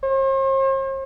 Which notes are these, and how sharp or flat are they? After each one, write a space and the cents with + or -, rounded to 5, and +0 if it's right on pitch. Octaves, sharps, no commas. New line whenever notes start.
C5 +45